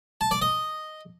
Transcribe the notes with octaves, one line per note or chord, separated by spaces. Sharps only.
A5
D5
D#5